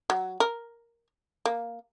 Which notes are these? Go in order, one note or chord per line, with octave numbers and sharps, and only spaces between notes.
F#3
A#4
A#3